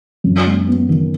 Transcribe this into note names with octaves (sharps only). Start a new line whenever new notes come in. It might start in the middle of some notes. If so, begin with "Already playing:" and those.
F#2
G#3
B3
D#3